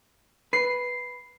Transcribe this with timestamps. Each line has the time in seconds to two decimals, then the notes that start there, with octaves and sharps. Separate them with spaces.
0.53 B4 C7